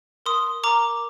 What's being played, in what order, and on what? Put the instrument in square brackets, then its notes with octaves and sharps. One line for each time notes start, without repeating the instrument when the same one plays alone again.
[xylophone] A#4 C6 D#6
A#4 A#5 D6